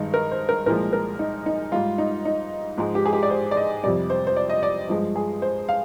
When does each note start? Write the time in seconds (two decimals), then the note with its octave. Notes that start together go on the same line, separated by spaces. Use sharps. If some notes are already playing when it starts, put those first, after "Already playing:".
Already playing: G2 D#3 G#3 D#4
0.14 A#4
0.31 C5
0.49 A#4
0.66 C2 A#2 F3 G#3 A#4
0.93 A#4
1.19 D#4
1.46 D#4
1.72 G#2 G3 F4
1.98 D#4
2.25 D#4
2.78 G#2 F3 G#3
2.95 G4
3.06 G#4
3.13 G4
3.23 D5
3.30 C5
3.51 D5
3.57 D#5
3.83 F2 C3 G3 D5
4.10 C5
4.27 C5
4.36 D5
4.50 D#5
4.63 D5
4.89 G2 F3 G#3
5.16 G#4
5.42 C5
5.69 F5